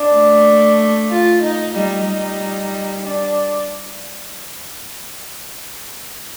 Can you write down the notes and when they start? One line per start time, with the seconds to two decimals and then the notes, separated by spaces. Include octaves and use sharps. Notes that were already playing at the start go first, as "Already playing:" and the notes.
Already playing: D4
0.14 A3
1.10 F4
1.42 D#4
1.74 G3 D#4
2.06 G3
3.01 D4